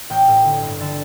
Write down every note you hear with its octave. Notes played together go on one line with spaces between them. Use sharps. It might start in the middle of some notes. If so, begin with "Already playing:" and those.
A1 G5
A2
D3
G1
D3 A5